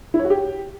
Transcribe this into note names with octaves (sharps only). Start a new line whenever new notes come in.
E4
C#5
F#4
G4